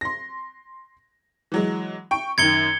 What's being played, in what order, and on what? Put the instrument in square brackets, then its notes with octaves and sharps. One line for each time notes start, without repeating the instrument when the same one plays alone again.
[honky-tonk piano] C6 A#6
E3 F#3 G#3
G5 C#6 D7
[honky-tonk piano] F#2 D#3 [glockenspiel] G#6 C#7 G7